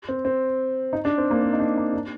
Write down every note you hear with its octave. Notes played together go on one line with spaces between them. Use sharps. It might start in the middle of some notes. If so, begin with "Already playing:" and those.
C4
C4
D#4
D4
C4
A#3
C4
D#4
D4
D#4
D4